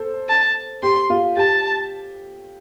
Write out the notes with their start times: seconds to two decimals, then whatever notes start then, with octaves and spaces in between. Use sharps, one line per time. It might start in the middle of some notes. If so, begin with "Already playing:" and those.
Already playing: A4 C5
0.29 A5
0.83 G4 C6
1.10 F4
1.37 G4 A5